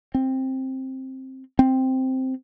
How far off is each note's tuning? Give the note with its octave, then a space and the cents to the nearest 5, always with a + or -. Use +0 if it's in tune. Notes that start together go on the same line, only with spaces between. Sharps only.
C4 +10
C4 +0